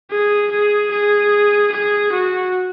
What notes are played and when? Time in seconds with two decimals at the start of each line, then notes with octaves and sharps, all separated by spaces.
0.11 G#4
0.51 G#4
0.91 G#4
1.72 G#4
2.12 F#4